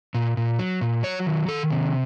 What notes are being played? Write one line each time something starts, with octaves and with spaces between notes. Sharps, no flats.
A#2
A#2
F#3
A#2
F#3 C#5
D#3
D#3 A4
C3